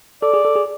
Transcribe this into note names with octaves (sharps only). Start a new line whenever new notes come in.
A4 D5
G#4
A4
G#4